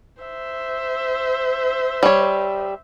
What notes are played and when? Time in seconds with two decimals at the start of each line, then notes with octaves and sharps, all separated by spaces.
0.22 C5 E5
2.03 G3 C#5